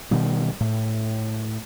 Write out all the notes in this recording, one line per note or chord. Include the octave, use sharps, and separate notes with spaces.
B2 D#3 G3
A2